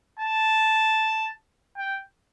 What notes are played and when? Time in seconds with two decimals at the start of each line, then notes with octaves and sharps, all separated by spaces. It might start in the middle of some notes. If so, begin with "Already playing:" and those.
0.19 A5
1.78 G5